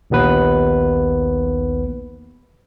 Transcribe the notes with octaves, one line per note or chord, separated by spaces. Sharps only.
A#1 D#2 B3 B4